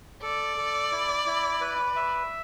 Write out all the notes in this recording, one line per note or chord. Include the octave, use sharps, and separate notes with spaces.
A4 D5
A4
E4
E4
B4
E5